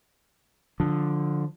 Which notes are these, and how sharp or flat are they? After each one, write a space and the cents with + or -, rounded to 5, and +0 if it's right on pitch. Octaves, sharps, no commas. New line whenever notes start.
D3 +0 F3 +15